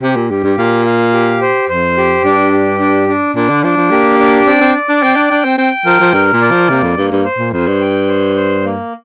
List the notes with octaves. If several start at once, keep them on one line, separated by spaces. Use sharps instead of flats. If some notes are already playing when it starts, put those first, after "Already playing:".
C3 G4
A#2
G2 G4
G2
A#2 F5
F5
G4
C5
F2 C5
G4
G2 D4
G4
D4
D4
A#2 D4
D3
F3 D4
F3
A#3 G4
D4
C4 D5
C4
D5
D4
C4 G5
D4
D4 G5
C4
C4 G5
F3 A#4
F3
G2 A#4
A#2
D5
F3
C3 A#3
F2
G2 A#3
G2
C5
A#2
F2 C5
G2
G5
C5
C5
A#3